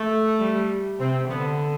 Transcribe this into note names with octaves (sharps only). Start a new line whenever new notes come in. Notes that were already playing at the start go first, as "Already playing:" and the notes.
Already playing: A3
G3
C3 C4
D3 B3